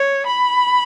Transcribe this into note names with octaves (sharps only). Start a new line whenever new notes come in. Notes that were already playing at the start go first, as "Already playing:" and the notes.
Already playing: C#5
B5